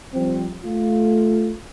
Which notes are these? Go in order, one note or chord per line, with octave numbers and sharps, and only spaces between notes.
F3 G3 C4
A3 F4